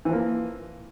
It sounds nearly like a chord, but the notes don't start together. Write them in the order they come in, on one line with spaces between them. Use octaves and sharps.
E3 F3 A#3